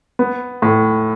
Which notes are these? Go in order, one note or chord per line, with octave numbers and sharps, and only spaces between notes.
B3
A2